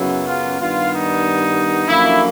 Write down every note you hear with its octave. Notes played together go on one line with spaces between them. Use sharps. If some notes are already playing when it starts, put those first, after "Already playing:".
Already playing: F#2 C#3 F#3 B3 E4
F4
G2 D#3 G3 B3 F4
D#4
F#2 D3 F3 A#3 E4